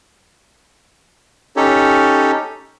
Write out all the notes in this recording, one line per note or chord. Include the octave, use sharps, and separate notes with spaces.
C#4 D#4 G4 A4 C#5